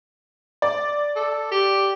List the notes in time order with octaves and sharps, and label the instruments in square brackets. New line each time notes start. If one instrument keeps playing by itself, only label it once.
[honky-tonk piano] D5
[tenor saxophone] A4
G4